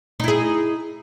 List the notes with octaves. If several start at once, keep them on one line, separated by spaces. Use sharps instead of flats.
D#4 E4 G#4